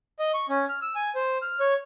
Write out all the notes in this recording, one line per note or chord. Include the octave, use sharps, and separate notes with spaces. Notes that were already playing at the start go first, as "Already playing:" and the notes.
D#5
C#6
C#4
F6
E6
G#5
C5
F6
C#5